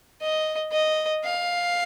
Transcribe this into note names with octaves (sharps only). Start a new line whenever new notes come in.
D#5
D#5
F5